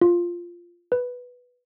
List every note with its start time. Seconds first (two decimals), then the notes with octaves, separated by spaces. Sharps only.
0.01 F4
0.92 B4